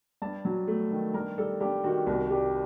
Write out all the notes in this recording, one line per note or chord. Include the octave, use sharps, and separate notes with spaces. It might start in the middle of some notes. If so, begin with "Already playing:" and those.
G2 A5
F#3
A3
D#3
G2 A#4
G3 A4
G2 G4
D#3 F#4
C2 F#4
G3 G4